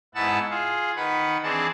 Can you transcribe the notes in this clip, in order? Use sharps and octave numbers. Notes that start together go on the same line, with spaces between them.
G#2 B3 E4 F#5 A5 E6
F4 G#4
D#3 B4 F#5 B5
E3 C4 D4 G#4 A5